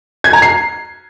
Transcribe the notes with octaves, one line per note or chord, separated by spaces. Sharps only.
G#6
A#5
C7